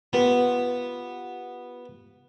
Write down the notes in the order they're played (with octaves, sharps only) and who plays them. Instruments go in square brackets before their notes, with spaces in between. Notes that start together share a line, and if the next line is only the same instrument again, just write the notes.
[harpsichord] B3 [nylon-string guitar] F4 G4 B4